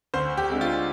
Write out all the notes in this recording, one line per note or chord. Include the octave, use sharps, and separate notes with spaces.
D2 C5
G4
D3 G#3 C4
F4